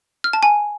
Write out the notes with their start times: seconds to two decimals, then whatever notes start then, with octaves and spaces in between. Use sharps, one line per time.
0.24 F6
0.33 A5
0.43 G#5